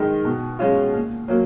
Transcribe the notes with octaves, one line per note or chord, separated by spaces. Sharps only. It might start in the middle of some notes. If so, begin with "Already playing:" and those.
Already playing: D#3 G#3 D#4
B2
G#3 C#4 F4
A#2
F#3 A#3